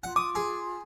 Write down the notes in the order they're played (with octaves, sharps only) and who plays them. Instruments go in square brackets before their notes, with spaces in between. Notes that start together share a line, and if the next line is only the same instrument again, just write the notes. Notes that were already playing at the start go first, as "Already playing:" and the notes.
[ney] F4 [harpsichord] F#5
[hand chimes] D6 [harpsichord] D#6
[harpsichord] G#4